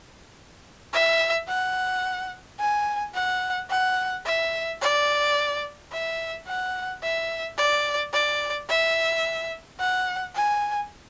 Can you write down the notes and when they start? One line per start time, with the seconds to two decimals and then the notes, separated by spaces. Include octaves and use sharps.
0.93 E5
1.48 F#5
2.59 G#5
3.15 F#5
3.70 F#5
4.26 E5
4.81 D5
5.92 E5
6.47 F#5
7.03 E5
7.58 D5
8.13 D5
8.69 E5
9.80 F#5
10.35 G#5